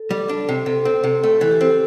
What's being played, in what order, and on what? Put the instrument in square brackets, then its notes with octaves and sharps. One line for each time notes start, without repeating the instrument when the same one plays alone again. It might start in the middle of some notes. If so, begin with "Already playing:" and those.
Already playing: [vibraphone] A4
[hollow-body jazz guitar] G3
D4
C3
[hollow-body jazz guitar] C3 [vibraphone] A4
[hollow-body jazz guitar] C4
C3
[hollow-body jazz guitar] A3 [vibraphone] A4
[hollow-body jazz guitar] E3 [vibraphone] A4
[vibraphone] G4
[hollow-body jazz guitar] C4